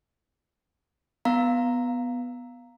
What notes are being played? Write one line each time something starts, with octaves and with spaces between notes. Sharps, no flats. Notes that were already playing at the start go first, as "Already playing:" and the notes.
B3 F5 A#5